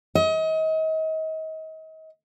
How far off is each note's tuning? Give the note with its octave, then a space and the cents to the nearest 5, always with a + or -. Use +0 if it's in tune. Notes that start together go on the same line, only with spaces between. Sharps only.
D#5 +35